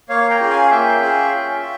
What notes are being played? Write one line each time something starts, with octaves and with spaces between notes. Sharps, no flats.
A#3 C#5 F5
G5 A#5
C#4 F4 G#4
F5 G#5
F5
A#3 E5 G5
C#4 F4 G#4
C#4
F4